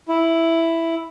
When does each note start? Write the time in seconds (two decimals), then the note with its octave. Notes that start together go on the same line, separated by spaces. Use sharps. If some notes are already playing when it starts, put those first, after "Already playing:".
0.09 E4